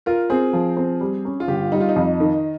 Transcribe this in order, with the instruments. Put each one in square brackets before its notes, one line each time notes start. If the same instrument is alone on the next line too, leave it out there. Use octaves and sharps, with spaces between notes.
[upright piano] F4 [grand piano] A#4
[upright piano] C4 [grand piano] G#4
[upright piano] F3
C4
G3
C#4
[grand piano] F4
[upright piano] G1 [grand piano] G4
[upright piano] G3 [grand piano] D#4
[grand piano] F4
D#4
[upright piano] F2
D#3